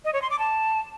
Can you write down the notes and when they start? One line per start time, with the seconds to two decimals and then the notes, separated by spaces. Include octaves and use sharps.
0.05 D#5
0.13 C#5
0.22 C6
0.30 D6
0.39 A5